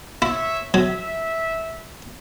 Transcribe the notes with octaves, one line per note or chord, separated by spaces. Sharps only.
E4 C#5 E5
F#3 E5